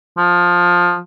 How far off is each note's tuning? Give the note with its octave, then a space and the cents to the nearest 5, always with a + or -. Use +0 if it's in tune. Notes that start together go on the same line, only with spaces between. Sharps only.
F3 +15